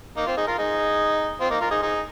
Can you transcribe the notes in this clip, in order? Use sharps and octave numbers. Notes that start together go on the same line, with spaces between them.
A#3 D#4
C4 F4
D#4 G#4
F4 A#4
D#4 G#4
C4 F4
A#3 D#4
F4 A#4
D#4 G#4
D#4 G#4